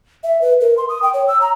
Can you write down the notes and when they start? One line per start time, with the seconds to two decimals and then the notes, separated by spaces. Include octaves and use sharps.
0.24 E5
0.41 B4
0.61 A#4
0.78 C6
0.89 D#6
1.02 G5
1.14 C#5
1.28 E6
1.41 A#5